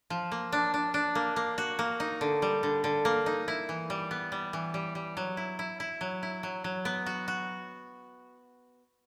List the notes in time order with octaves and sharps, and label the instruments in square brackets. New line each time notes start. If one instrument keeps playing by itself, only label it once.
[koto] F3
A#3
D4
D4
D4
A#3
A#3
F#4
A#3
D#4
D3
G3
D3
D3
A#3
D#4
E4
E3
G3
B3
G3
E3
G3
G3
F#3
E4
E4
E4
F#3
E4
F#3
F#3
B3
F#4
F#4